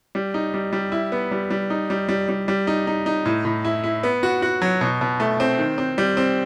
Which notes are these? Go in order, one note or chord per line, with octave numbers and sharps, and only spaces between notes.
G3
D#4
G3
G3
E4
B3
G3
G3
D#4
G3
G3
G3
G3
D#4
D#4
D#4
A2
A2
E4
E4
B3
F#4
F#4
F#3
B2
B2
A3
C4
D#3
C4
G3
C4